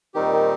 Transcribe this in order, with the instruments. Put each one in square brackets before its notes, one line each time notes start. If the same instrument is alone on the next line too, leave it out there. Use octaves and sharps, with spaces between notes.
[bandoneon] A#2 G3 C4 D#4 G4 [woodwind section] D#3
[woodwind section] D#3